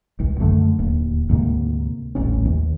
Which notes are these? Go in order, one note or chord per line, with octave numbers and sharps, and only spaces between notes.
G#1 C#2
F#2 D3 A3
D1 D#2
D2 G#2 C3 A#3
D#1 A1 C#4
D#2